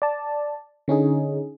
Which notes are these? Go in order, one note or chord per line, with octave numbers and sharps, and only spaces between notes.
D5 A5
D3 C#4 D#4 G#4